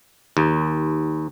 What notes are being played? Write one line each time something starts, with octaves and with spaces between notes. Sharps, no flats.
D#2